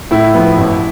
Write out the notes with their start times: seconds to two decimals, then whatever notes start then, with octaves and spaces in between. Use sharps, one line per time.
0.11 A2 E4
0.34 F3 B3
0.58 A1